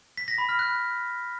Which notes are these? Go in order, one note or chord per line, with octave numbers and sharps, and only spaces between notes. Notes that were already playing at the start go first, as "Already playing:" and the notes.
B6
A#6
B5
F6
F#6